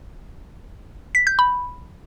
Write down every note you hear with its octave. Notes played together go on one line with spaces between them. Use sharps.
B6
G6
B5